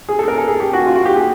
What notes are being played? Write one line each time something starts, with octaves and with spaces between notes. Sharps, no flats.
G#4
A4
A#4
A4
G#4
G4
F#4
F4
F#4
G4
G#4